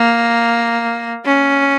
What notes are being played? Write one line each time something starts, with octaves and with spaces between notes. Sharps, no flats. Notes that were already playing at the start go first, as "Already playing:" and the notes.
Already playing: A#3
C#4